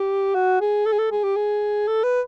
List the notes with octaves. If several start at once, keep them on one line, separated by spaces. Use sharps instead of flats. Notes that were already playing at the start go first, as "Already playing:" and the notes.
Already playing: G4
F#4
G#4
A4
G#4
A4
G#4
G4
G#4
A4
B4